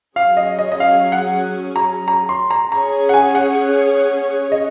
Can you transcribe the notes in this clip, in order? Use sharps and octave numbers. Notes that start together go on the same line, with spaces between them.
F#3 C#4 G#4 F5
D#5
D#5
D#5
F5
F#5
A#5
A#5
C6
A#5
C#4 G#4 C#5 A#5
F#5
G#5
F#5
D#5